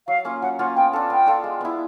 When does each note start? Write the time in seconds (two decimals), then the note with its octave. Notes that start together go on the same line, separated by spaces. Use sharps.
0.07 F#3 F5
0.25 A#3 C#4 F4
0.42 F#3 F#5
0.59 A#3 C#4 F4 F#5
0.76 B3 G5
0.93 D4 F4 A4
1.10 B3 G5
1.26 D4 F4 A4
1.44 G#3
1.61 B3 E4